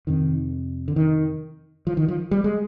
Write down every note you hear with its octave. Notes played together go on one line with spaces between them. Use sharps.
F2 C3 D#3
D3
D#3
F3
D#3
F3
G3
G#3